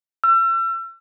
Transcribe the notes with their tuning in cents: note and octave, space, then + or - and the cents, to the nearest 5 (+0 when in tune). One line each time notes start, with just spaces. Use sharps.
E6 +40